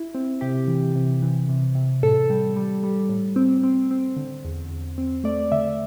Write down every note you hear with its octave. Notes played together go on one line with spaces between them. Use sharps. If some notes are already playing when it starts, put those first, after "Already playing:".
Already playing: E4
C4
C3 G4
E3
C3
E3
C3
C3
A2 A4
G3
G3
G3
A2
C4
C4
C4
D3
E2
E2
C4
A3 D5
D3 E5